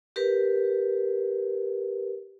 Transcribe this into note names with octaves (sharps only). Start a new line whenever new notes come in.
G4 A#4 B4